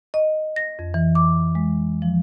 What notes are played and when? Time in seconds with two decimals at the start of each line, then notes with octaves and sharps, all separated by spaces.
0.14 D#5
0.56 A#6
0.79 F2
0.94 E3
1.15 D6
1.55 G#3
2.02 F3